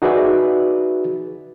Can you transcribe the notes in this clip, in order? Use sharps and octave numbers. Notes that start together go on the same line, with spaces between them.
D#4 F#4 G#4 B4 D5 E5